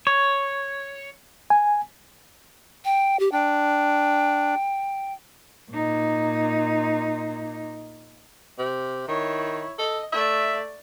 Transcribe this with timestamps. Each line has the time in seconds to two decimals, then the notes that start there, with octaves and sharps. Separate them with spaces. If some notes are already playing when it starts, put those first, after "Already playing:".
0.07 C#5
1.50 G#5
2.85 G5
3.20 G4
3.32 D4 G5
5.71 A#2 D#4
8.59 C3
9.08 D#3 E4 C#5
9.79 A4 D#5
10.13 A3 D5 E5